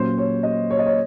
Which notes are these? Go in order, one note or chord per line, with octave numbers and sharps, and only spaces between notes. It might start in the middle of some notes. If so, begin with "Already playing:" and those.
Already playing: A#2 F#3 C#4 C5
C#5
D#5
C#5
D#5
C#5